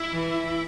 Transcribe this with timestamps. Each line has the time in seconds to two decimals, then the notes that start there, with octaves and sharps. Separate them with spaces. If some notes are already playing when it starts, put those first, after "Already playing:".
Already playing: E4
0.12 E3